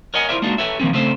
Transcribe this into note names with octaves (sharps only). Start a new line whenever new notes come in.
A#4 C#5 D#5 F#5 G#5
E4 F4 A#4 C5 D5 E5
G#3 A#3 D4 D#4 F4 F#4
G4 A4 B4 C#5 E5
D#3 F3 A#3 C4 C#4
C#3 A3 C4 C#4 A4 C5